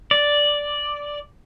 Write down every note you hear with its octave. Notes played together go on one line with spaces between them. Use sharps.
D5